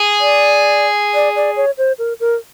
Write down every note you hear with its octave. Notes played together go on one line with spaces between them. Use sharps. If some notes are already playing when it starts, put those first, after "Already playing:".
Already playing: G#4
D5
D5
D5
C#5
C5
A#4
A#4